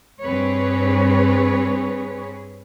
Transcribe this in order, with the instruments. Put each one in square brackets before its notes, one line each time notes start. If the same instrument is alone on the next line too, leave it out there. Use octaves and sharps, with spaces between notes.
[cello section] G2 C4 G#4 B4 C#5